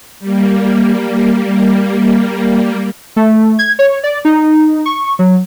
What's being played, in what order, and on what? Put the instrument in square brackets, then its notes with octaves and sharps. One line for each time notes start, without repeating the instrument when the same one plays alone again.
[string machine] G3 A#3
[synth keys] A3
G#6
C#5
D5
D#4
C#6
F#3